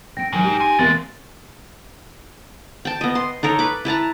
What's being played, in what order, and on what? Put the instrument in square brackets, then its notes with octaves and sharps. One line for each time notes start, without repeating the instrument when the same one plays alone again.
[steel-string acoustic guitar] C4 G5 [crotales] A#6 D7
[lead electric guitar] G#2 [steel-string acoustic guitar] D#3 F#3
[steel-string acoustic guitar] D#4 G4
[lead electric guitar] G#2 G#5 [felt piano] C6
[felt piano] E2 C3 A#3 [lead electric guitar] G2 G#3 [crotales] A6
[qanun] G5 A5
B3 D#5
C6
D#4 A4 A#4 C#5
B4 D6
E4 B4 A5 A#5